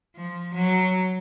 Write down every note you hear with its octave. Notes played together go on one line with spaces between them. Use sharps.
F3
F#3